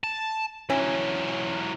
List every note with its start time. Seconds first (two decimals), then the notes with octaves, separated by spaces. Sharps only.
0.04 A5
0.70 E3 F#3 C#4